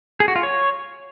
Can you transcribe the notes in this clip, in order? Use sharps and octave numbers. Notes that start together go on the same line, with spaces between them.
G#4
F#4
F4
C#5